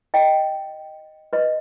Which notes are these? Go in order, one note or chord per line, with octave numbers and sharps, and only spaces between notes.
D#5 G5
B4 D#5